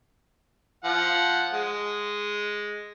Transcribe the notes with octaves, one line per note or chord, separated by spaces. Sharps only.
F3 F#5
G#3